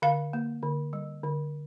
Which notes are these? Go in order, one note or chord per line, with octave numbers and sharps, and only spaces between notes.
D3 F5
A#3
D3
G3
D3